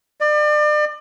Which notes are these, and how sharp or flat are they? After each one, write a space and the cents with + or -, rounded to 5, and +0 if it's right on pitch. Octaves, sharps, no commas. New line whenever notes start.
D5 +35